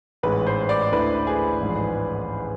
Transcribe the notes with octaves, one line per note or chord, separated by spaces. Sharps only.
A1 G#2 G#3 B4
C5
D5
D2 D3 A3 E4 B4
G#4
A1 G#2 F3